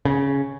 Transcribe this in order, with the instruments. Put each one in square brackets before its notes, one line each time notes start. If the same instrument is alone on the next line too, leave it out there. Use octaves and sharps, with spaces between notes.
[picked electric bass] C#3